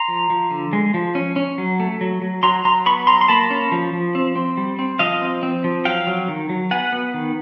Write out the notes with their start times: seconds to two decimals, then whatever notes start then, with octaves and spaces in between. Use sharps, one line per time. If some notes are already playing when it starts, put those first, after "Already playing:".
Already playing: A#5 C6
0.08 F3
0.30 F3
0.51 D3
0.73 G#3
0.94 F3
1.15 C#4
1.36 C#4
1.58 F#3
1.80 A3
2.01 F#3
2.22 F#3
2.43 F#3 A#5 C6
2.64 F#3 A#5 C6
2.86 B3 B5 C#6
3.07 F#3 A#5 C6
3.21 C6
3.28 A#3 A5 B5
3.50 C#4
3.72 F3
3.93 F3
4.15 C4
4.36 C4
4.57 G3
4.79 C4
4.99 F3 D#5 F5
5.21 C4
5.43 C4
5.64 F3
5.85 F#3 F5 G5
6.07 F#3
6.28 D#3
6.49 F#3
6.71 B3 F#5 G#5
6.93 B3
7.14 D#3